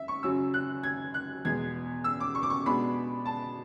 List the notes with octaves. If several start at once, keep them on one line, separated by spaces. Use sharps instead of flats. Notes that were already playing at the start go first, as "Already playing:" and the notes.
Already playing: E5
C#6
F#2 C#3 F#3 E6
F#6
G#6
F#6
E2 B2 G#3 G#6
E6
D6
C#6
D6
C#6
B2 G#3 B3 D4 B5
A5